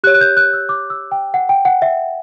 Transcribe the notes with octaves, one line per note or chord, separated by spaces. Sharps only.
G4 C#5 F#6
F#6
G6
F#6
E6
D6
E6
G5
F#5
G5
F#5
E5